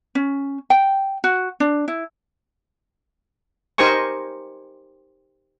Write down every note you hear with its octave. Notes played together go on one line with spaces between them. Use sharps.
C#4
G5
F#4
D4
E4
D#4 G4 A#4 C5 G#5 C#6